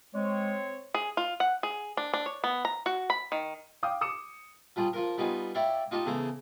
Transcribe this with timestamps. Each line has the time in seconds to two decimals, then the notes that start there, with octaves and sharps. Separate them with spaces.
0.14 G#3 C4 C#5
0.94 G#4
1.17 F4
1.40 F#5
1.63 G#4
1.97 D4
2.13 D4
2.26 C#5
2.44 B3
2.65 A#5
2.86 F#4
3.10 B5
3.32 D#3
3.83 F5 G5 D6 D#6
4.01 D6 D#6 C#7 E7
4.76 F3 G3 F4 G#4
4.93 F3 F4 A#4
5.18 G3 B3 D#4 F4 G#4
5.55 E4 G4 C#5 D5 E5 F5
5.91 D#4 F4 G4 D#5 F5 A5
6.06 E2 C#3 G#4 A4 C5 A#5